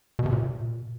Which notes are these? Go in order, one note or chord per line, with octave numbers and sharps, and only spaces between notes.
B2
C3
A#2